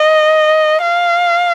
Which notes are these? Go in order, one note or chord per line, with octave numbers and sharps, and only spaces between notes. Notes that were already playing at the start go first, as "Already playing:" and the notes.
Already playing: D#5
F5